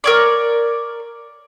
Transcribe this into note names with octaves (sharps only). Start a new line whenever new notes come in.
A#4 C#5 D5